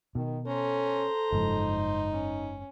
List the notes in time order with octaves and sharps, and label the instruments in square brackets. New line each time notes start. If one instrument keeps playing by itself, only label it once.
[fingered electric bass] B2 [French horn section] D#3
[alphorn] C#4 [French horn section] A4 [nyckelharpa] C5 A#5
[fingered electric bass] F#1 G#2 F3 [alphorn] D#4
[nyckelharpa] C#4